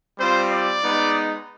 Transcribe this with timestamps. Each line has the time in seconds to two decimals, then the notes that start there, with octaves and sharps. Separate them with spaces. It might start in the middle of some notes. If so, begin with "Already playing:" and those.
0.19 G3 C4 F4 C5
0.51 D5
0.82 G#3 B3 D#4